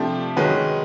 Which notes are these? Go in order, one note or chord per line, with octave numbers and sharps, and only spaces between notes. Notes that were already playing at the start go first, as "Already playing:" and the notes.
Already playing: C3 F3 A3 D4 G4
D#3 G#3 C#4 F#4 B4